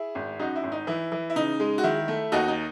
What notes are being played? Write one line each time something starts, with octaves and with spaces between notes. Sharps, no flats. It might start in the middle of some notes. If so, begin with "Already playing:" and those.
Already playing: E4 G#4
G#1
F#2 D#4 F#4
E4
G#1
D#4
E3 E4
E3
E4
C#3 D#4
G#3
F#4
D#3 E4
A3
D#2 D#4 F#4
D#4